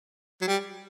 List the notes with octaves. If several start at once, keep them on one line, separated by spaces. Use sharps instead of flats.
F#3
G3